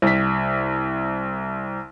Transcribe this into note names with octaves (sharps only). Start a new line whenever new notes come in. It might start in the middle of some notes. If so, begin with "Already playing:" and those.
C2 B6